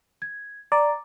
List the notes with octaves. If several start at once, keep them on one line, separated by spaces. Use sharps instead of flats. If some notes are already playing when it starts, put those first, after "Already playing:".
G#6
D5 A#5